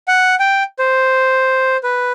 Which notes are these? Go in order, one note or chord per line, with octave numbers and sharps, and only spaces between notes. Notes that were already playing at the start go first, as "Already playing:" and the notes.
F#5
G5
C5
B4